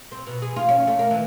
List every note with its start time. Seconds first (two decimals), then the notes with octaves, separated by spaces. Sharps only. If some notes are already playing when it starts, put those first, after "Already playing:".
0.12 C4
0.27 B2
0.42 G#4
0.56 F4
0.69 C#4
0.87 A3
0.99 A#3
1.11 E3